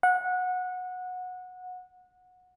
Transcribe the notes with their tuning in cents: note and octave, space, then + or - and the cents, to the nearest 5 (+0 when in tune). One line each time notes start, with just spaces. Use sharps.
F#5 -20